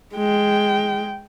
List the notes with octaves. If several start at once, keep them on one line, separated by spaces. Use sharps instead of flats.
G#3 G5